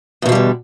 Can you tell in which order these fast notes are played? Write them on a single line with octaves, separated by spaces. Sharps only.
E2 B2 F3 G3 D3